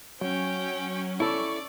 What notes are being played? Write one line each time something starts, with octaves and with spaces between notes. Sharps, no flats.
F#3 C#4 G5
E4 A4 D5 C#6